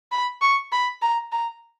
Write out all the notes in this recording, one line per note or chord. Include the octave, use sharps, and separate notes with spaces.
B5
C#6
B5
A#5
A#5